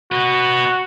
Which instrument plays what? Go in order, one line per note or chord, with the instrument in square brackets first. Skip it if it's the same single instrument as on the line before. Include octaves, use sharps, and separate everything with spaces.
[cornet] F#4 [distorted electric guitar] B4 D#5